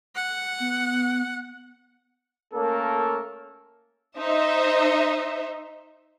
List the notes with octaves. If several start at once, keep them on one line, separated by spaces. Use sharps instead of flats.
F#5
B3
A3 A#3 C#4 A4 A#4
D#4 C5 E5